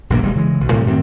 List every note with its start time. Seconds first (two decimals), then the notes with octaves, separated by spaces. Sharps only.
0.10 A#1 G2 A#2 A#3
0.23 E1 G3 G#3
0.35 C#3 E3 G#3
0.61 B1
0.73 A2 C3 F#3 G3
0.87 F#2 A2 D#3 C4